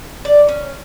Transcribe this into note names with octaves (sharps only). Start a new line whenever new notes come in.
D5
C#4